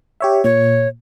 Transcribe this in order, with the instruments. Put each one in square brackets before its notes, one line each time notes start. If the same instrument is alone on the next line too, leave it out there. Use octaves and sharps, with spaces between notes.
[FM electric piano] G4 C#5 E5
[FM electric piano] A#2 [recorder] C#5